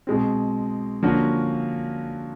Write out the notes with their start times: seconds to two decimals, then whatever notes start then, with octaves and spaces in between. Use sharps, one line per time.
0.07 B2 G#3 C4
1.03 D3 F3 A#3 C#4 F#4